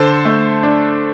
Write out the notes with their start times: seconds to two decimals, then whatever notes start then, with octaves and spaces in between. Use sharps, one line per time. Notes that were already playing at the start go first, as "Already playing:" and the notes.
Already playing: D3 A4 C5
0.25 A3
0.63 D4